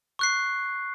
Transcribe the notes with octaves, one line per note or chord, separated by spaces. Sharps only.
C#6 F#6 C7